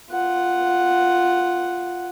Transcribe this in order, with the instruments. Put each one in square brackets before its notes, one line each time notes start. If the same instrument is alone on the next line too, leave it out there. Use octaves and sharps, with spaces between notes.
[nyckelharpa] F4 F#5